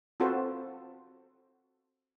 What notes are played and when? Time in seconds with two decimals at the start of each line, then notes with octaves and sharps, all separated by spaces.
0.20 C4 F4 F#4 A4 B4 C5